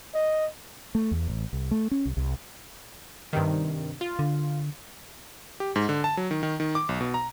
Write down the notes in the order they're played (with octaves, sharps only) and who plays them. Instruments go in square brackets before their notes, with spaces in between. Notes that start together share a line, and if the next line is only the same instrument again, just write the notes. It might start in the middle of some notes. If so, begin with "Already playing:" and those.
[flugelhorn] D#5
[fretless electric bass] A3
E2
A1
C2
A3
C#4
C2
C2
[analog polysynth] G2 C3 D#3
F4
[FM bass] D3
[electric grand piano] G4
G#2
D3
A5
F#3
D#3
D#3
D#3
D6
B1
B2
A#5